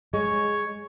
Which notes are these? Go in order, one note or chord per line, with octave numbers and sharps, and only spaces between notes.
G#3 C#5